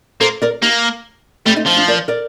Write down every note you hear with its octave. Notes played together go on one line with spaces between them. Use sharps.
A#3 A4 C5
A#4 D5
A#3 D#4 G4
G3 A3 C4
C4 D#4
F3 C4 D#4
D4 F4
A#4 D5
A#4 D5